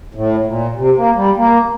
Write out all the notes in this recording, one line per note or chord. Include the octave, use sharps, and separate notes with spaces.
A2
A#2
C3
A#3
G3
A#3